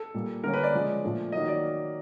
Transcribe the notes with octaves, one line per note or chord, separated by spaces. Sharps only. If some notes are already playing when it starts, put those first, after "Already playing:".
Already playing: A4
A#2 G3 A#3
D3 G3 A#3 C#4 A#4
B4
D5
C#3 F3 G#3
A#2 F3 A3 D4
D#3 F#3 A#3 D#5
D5